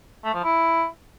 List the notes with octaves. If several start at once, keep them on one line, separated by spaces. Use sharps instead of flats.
A3
F3
E4